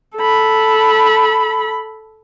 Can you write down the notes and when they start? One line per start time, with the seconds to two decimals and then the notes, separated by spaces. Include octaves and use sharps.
0.17 A4 B5